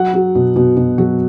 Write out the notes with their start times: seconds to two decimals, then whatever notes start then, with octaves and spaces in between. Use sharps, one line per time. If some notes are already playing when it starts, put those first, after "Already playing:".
Already playing: F#3 F#5
0.14 F#3
0.35 B2
0.56 B2
0.77 B2
0.98 F#3